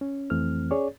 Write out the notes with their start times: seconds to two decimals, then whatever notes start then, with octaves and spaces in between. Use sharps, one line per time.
0.01 C#4
0.30 F2 E3 A3 C4 F6
0.71 C#4 G#4 C#5 D5